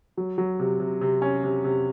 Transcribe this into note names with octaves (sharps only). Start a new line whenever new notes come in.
F#3
F#3
C3
C3
C3
C#4
C3
C3